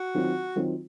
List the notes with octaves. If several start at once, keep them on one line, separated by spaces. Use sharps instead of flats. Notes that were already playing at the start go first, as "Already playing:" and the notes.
Already playing: F#4
D#3 F#3 C4 F4
D#3 F#3 C4 F4